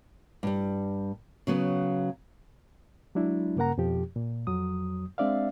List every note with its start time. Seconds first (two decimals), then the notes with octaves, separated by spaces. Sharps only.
0.43 G2 G3
1.47 C#3 F#3 B3
3.15 F#3 G#3 D4 E4
3.56 G2 C#3 A#3 A#4 F#5 A#5
3.78 F2 B2 F3 G4
4.16 A#2
4.47 F2 F#3 D#6
5.18 G#3 C4 D4 D5 E5 F5